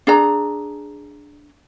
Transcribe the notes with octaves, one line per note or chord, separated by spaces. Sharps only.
D4 G#4 A#5